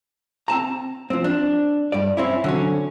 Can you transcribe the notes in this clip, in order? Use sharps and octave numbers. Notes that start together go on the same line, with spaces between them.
C4 A5 A#5
F3 C4
D4
G2 D5
C4 C#4 E4
D3 F#3 C#4